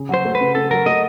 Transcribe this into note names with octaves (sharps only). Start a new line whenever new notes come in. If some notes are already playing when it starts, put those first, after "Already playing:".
Already playing: C#3
F#3 C5
A3
B4
C#3
C#3 A4
F#3 A#4
A3 D#5